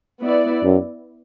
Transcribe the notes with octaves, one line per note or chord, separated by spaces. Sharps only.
B3 E4 D5
F#2